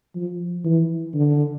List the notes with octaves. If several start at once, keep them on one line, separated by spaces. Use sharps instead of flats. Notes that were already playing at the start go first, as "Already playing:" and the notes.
F3
E3
D3